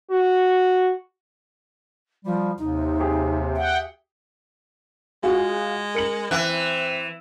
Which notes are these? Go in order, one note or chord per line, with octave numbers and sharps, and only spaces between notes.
F#4
F3 G3
D#2 C3 D#4
G4 G#4
E5 F#5 G5
G#3 F4 F#4 G#4
A#4 C#7 F#7
E3 C4 F#6